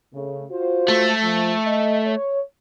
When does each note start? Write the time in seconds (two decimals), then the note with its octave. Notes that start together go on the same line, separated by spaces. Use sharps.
0.14 C#3 A3
0.50 F4 F#4 C5
0.88 A3
1.23 F3
1.67 D#5
2.06 C#5